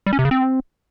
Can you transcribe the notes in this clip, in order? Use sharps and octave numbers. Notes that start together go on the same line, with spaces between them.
G3
C#4
C3
C#3
C4